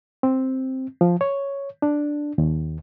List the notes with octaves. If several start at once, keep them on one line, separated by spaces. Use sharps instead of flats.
C4
F3
C#5
D4
D#2